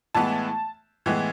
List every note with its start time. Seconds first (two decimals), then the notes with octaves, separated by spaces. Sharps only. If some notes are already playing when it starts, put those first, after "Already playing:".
0.15 A2 E3 G#3 B3 A5
1.06 A2 E3 G#3 B3